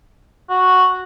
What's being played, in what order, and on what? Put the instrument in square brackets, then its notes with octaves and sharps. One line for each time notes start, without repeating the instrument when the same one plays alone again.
[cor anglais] F#4